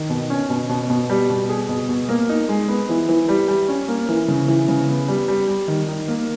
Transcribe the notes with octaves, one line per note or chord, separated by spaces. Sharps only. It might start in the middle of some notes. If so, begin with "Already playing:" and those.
Already playing: D#3
B2
C#4
B2
B2
B2
G3
B2
G#4
B2
B2
A#3
D#4
G#3
B3
E3
E3
G3
G3
C#4
A#3
E3
C#3
E3
C#3
B3
G3
G3
G3
D#3
D#4
A#3